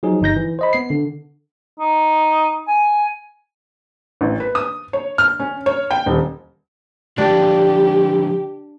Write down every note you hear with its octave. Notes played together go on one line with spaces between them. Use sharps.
F3 F#3 D#4 G#4
G1 D#4 G6 A#6
E3
C5 D#5 B5
B3 C7
D3
D#4
G#5
A1
B4
D#6
C#5
F6
C#4
C#5
G5
D#1
D3 F3 D4 G4 G5